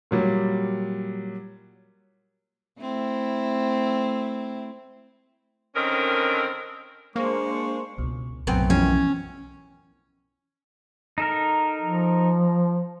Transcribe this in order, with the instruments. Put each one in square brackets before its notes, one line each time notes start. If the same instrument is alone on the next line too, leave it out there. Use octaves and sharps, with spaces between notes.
[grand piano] A#2 F#3 G3
[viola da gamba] A3 C4 E4
[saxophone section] D3 D#3 C4 C#4 A#4
[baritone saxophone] G#3 [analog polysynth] A#3 [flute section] D4 C5 [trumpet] C#6
[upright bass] C#2 [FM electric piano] B2
[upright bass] B1 A2 [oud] F#2 B3 C4 [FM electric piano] C3
[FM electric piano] E3 F3 [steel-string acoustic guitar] C#4
[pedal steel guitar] D#4 A4 A#4
[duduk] F3